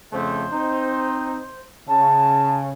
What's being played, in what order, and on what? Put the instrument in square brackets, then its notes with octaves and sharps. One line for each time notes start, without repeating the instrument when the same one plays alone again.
[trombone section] F2 C#3 A3 [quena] C5
[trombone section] C4 D#4
[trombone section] C#3 [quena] A5